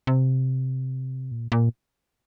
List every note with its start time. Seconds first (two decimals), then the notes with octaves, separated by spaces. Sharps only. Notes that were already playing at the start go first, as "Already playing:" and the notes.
0.07 C3
1.32 A#2
1.52 A#2